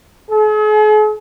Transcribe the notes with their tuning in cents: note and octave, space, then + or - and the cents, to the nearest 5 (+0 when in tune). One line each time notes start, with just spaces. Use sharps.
G#4 +45